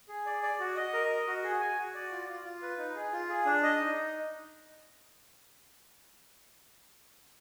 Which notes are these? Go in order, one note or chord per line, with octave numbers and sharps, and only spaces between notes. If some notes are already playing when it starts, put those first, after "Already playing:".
G#4
D5
D5
F#4
D#5
A#4
D#5
F#4
G#4
G#5
F#4
D5
F4
F4
F4
B4
D#4
G#4
F4
G#4
D4
D#5
D#4